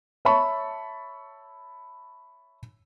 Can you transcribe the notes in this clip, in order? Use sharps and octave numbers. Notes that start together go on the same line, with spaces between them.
C#5 E5 A5 B5 C#6